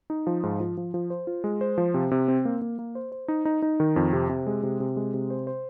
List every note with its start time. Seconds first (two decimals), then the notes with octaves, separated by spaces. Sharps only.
0.10 D#4
0.27 F3
0.43 G#2
0.60 F3
0.77 F3
0.94 F3
1.10 C5
1.27 F4
1.44 G#3
1.61 C5
1.78 F3
1.94 C3
2.11 C3
2.28 C4
2.45 A#3
2.62 A#3
2.79 A#3
2.95 C5
3.12 C5
3.28 D#4
3.45 D#4
3.62 D#4
3.80 D#3
3.96 F2
4.13 C3
4.29 C3
4.47 G#3
4.63 C3
4.80 C3
4.97 G#3
5.14 C3
5.30 C5
5.47 C5